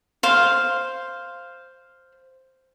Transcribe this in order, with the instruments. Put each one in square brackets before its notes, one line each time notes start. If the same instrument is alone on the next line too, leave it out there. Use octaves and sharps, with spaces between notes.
[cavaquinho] C5 F5